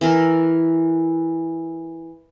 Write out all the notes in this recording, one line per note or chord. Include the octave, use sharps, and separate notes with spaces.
E3 E4 A#4